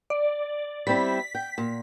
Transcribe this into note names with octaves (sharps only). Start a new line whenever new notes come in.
D5
G3 C4 E4 B6
G5
A#2